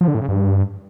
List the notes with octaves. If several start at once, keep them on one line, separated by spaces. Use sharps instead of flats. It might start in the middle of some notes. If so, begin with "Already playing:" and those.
F3
D3
A2
C#3
G2